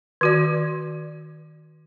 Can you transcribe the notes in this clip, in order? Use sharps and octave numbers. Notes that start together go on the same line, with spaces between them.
D#3 F#4 D5